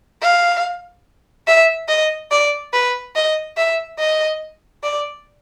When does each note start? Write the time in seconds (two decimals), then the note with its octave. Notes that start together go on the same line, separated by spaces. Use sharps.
0.22 F5
1.47 E5
1.89 D#5
2.31 D5
2.73 B4
3.16 D#5
3.57 E5
3.99 D#5
4.84 D5